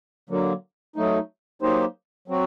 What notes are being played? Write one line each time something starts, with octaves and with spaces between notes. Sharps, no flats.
D3 F#3 A#3
F#3 A3 D#4
F#3 A#3 D#4 G4 C5
F#3 C4 F#4